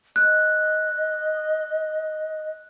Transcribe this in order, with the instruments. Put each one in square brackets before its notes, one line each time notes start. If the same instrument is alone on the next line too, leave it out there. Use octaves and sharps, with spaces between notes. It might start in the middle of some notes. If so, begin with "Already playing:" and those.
[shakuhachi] D#5 [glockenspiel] F#6